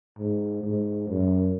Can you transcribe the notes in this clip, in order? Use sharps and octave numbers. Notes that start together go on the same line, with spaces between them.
G#2
G#2
F#2